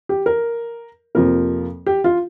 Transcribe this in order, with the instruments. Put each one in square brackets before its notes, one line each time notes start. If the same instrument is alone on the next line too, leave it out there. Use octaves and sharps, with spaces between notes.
[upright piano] G4
A#4
F2 C3 F3 A#3 A#4
G4
F4